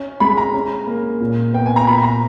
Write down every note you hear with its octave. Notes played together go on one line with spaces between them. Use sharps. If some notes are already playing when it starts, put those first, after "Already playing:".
Already playing: C#4
G#3 B5
A#5
C#4
A#3
A#2
B3 G5
G#5
A#5
A#2 B5
A#5